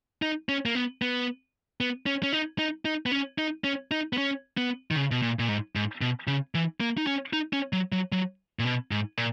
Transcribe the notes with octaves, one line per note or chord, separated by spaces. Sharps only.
D#4
C#4
A#3
B3
B3
B3
C#4
C#4
D#4
D#4
D#4
B3
C#4
D#4
C#4
D#4
B3
C#4
B3
D#3
C#3
B2
A#2
A#2
G#2
G#2
B2
C#3
E3
A#3
D#4
C#4
D#4
C#4
F#3
F#3
F#3
A#2
B2
G#2
A#2